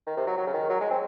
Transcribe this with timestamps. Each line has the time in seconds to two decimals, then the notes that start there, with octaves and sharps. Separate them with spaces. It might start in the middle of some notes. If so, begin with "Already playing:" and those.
0.07 D#3
0.17 C3
0.27 F#3
0.37 F#3
0.47 C#3
0.53 D#3
0.70 F#3
0.81 G#3
0.90 C4